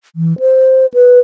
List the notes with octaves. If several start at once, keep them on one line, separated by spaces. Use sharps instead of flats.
E3
C5
B4